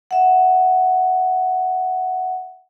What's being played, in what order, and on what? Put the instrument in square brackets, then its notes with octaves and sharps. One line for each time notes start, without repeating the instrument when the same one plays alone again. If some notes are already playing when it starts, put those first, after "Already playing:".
[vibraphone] E5 F#5